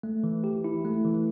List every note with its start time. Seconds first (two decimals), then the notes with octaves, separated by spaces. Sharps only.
0.03 A3
0.24 E3
0.44 G4
0.64 E4
0.85 A3
1.05 E3